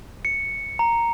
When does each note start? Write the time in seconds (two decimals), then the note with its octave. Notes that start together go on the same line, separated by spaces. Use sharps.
0.25 C#7
0.79 A#5